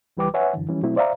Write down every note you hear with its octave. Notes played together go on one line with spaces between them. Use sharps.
C#2 E3 G3 B4 G5 D6
B4 C#5 E5 F#5 G#5
F#2 D3 E3
E3 F3 G3 C#4
B2 F#3 A3 C4 E4
C5 D5 E5 F5 A#5